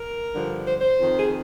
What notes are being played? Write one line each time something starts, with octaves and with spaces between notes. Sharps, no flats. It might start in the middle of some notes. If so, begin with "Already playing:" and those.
Already playing: A#4
G2 D3 F3
C5
C5
F2 D#3
G#4